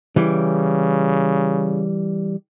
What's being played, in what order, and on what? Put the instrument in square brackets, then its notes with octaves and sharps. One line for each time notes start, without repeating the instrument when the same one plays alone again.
[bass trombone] C#3 [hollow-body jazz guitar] E3 G3